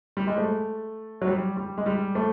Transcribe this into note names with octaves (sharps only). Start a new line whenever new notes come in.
G3
G#3
A3
F#3
G3
G3
G#3
G3
A3